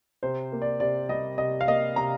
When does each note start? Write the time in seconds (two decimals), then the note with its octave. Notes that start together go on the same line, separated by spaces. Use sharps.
0.23 C3 C5
0.52 A#3
0.62 D5
0.80 C3 D5
1.09 G3 D#5
1.38 C3 D#5
1.61 F5
1.68 A#3 D#5
1.96 C3 A#5